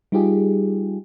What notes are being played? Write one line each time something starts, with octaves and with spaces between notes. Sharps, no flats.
G3 D#4 F4 G4 G#4